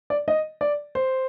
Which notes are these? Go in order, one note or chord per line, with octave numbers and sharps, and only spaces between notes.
D5
D#5
D5
C5